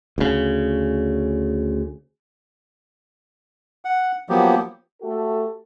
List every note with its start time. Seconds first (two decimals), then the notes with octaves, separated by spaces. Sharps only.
0.18 D2 C#3
3.85 F#5
4.29 F3 F#3 A#3 B3 G4
5.02 A3 F#4 G4 A4